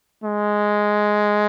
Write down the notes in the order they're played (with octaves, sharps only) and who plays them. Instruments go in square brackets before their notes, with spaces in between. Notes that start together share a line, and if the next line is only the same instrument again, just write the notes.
[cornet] G#3